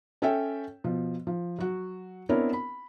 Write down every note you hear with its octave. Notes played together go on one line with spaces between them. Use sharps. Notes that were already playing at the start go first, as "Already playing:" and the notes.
C#4 A4 C#5 E5 G5
B2 F3
F3
F#3 F#4
B3 C4 D4 E4 A#4 C#5
B5